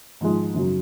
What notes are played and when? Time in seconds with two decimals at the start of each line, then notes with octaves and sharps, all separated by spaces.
0.21 G#2 F3 G#3
0.55 F#2 C#3 F#3